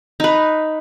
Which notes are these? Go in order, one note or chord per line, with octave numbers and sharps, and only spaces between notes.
D#4 B4